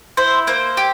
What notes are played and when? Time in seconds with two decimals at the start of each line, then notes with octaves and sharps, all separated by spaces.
0.17 E4 C5
0.47 A#3 C5
0.77 G4